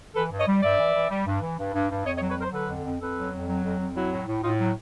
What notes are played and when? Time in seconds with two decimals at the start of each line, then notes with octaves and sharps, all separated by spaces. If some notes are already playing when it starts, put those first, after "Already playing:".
0.16 E3 A4 B4
0.32 G2
0.39 C#5 D#5
0.47 G3
0.63 G2 D5 E5
0.79 E3
0.94 E3
1.10 G3
1.27 G2
1.42 E3
1.59 G2
1.74 G2
1.91 G2
2.06 F2 C#5 D#5
2.17 C#5 D#5
2.22 F#3
2.29 B4 C#5
2.37 F#3 A#4 C5
2.53 D3 A4 B4
2.69 F2
2.85 F2
3.01 F2 A4 B4
3.17 F#3
3.32 F2
3.48 F#3
3.64 F2
3.80 F2
3.96 F#3 E4 F#4
4.12 A2
4.27 A2
4.43 A2 D#4 F4
4.60 F#3